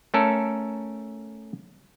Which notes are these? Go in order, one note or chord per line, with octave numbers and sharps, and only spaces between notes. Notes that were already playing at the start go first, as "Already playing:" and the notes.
A3 C#4 A4 A#4